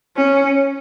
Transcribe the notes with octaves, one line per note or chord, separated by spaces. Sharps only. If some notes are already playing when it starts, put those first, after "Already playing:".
C#4